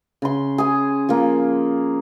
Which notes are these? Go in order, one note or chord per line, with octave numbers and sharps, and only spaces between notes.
C#3 C6
G#4 G#5
F3 A#3